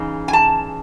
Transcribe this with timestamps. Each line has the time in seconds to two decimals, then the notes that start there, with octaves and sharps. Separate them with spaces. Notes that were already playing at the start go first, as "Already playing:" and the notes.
Already playing: C#3 E3 D#4
0.28 G#5
0.33 A5